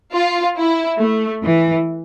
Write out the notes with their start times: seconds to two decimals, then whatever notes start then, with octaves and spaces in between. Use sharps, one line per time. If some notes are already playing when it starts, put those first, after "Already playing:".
0.14 F4
0.57 E4
1.00 A3
1.43 E3